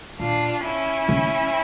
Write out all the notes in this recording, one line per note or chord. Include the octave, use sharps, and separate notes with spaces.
A#2 D4 F4
C#4 E4
C#3